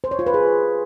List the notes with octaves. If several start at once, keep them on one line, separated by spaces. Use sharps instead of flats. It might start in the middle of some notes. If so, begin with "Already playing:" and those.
C5
C#5
F4
B4
G#4